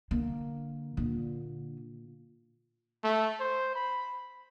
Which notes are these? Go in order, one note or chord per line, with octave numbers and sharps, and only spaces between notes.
D3 A#3
A#2 D3
A3
C5
B5